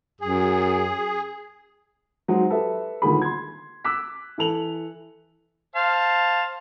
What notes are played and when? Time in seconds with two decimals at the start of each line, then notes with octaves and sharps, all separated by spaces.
0.21 F#2 G#4
2.28 F#3 G#3 D#4 G#4 C5
2.50 G4 A4 B4 E5
3.02 D#1 D2 D#3 A#3 G#4 B5
3.22 C6 G#6
3.85 D6 E6 F#6 B6
4.38 E3 A4 F7 F#7
5.76 C5 F5 A5